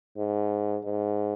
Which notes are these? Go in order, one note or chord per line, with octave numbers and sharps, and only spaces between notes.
G#2
G#2